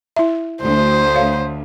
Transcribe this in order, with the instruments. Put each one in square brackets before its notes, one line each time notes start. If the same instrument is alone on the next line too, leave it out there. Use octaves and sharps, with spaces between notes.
[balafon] E4 E5
[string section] D2 [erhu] C5
[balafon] C#5 F5